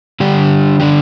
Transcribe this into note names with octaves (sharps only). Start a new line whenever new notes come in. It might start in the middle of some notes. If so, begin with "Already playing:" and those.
D3 G3 D4 G4
D3 G3 D4 G4